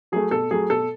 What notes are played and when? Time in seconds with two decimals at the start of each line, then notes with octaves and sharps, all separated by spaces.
0.12 F#3 A3 G#4
0.31 B2 A4
0.51 F#3 A3 G#4
0.70 B2 A4